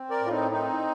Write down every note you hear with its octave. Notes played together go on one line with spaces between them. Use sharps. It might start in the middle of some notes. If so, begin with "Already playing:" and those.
Already playing: C4
A#4 D5
A2
F4
C4 D#4
C4 D#4